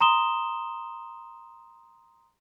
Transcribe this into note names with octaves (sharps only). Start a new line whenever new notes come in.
A#5 C6 D#6 E7 G7